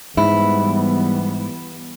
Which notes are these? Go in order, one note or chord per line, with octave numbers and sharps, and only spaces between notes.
G#2 E3 G3 B3 E4